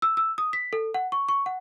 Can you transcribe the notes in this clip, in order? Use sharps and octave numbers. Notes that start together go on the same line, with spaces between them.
E6
E6
D#6
B6
A4
F#5
C#6
C#6
F#5